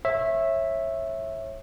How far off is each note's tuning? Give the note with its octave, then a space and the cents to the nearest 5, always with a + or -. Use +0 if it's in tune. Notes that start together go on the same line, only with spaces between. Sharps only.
C#5 -25 E5 +0